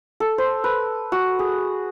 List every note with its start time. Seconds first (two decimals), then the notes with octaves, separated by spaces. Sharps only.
0.20 A4
0.38 C5
0.64 B4
1.12 F#4
1.39 G#4